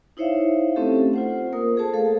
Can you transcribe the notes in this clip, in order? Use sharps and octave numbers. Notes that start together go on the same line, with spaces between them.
D#4 E4 C5 C#5 E5 F5
A3 C4 C#4 G4 A4
F4 C5 F#5
A#3 A#4 D#6
G#4 A4 C5 A5
A3 A4 F5